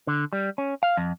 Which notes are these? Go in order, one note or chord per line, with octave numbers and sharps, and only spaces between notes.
D3
G3
C#4
F5
F2